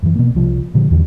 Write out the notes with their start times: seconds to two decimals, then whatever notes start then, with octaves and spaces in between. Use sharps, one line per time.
0.02 F#2 E3
0.15 B2 A#3
0.35 C2 F3
0.74 A#2 D3 F3 G#3
0.91 E2 G2 D3 E3